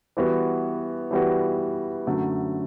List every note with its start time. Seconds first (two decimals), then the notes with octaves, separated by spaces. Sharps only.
0.17 E3 G3 B3 F#4
1.11 E3 G3 B3 F#4
2.07 F#2 D3 F#3 A3